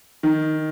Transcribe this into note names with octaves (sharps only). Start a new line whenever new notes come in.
D#3